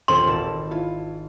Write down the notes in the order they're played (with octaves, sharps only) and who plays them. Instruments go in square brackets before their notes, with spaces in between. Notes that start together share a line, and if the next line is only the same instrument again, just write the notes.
[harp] D#1 F4 C5 [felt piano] C4 A4 [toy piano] C6
[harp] G#1 A5 E7
[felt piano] E4 F4